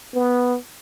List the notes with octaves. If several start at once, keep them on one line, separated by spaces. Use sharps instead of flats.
B3